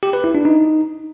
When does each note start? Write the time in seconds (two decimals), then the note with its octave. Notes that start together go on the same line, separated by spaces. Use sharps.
0.03 G4
0.13 B4
0.24 E4
0.35 D4
0.45 D#4